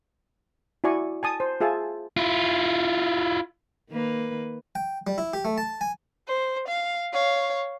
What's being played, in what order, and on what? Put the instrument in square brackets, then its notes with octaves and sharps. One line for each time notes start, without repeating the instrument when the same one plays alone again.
[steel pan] E4 F#4 D5 G#5 C#6
G#5 A5 D#6
C5
F4 G#4 E5 G#5 A5
[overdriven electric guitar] E4 F4
[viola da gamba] D#3 A#3 B4
[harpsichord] G5
G3
E4
G4
A3
A5
G#5
[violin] C5
F5
C#5 F5